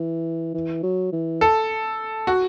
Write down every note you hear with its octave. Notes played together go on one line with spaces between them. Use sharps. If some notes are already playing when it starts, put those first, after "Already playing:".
Already playing: E3
E3
F#3
E3
A4
F#4